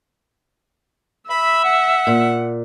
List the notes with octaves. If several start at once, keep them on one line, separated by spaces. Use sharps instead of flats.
E5 B5
F#5
A#2